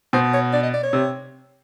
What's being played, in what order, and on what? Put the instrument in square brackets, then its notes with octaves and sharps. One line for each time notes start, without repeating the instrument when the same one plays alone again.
[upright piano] B2 [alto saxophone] C5
[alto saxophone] C#5
D5
D#5
D5
C#5
[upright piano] C3